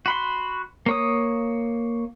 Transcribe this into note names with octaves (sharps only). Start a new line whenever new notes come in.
F#4 B5 C6
A#3 C#5 D#6